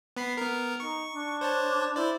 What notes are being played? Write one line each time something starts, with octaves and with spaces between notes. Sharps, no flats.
B3 B5 C7
B3 A#4
D#4 C#6
D4
C5 C#5 A5
E4 C5 D5